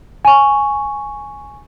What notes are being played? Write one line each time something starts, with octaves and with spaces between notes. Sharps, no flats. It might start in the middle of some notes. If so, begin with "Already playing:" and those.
G#5 C#6